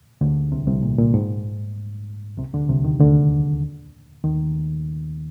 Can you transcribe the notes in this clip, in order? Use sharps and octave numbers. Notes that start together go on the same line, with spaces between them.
D2 D3
C2 C3
C2 C3
A#2
A#2
G#2
C2 C3
D2 D3
C2 C3
D#2 D#3
D2 D3
D#2 D#3